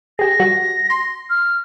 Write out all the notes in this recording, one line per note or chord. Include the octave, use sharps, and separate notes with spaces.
G4 G#4 A#6
G3 F#4
C6
F6